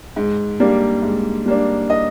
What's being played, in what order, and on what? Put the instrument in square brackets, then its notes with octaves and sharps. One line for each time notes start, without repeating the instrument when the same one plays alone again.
[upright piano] G#2
G3 A#3 D4
G#2
G3 A#3 D4
D#5